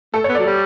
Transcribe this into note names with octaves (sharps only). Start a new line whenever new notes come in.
A3 A4
C#5
B3
F#3 D5
G3